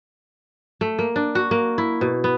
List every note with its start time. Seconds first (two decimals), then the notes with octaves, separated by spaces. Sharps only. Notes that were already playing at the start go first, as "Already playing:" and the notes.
0.81 A3
0.99 A#3
1.16 D4
1.35 F#4
1.51 A#3
1.78 E4
2.01 B2
2.24 B3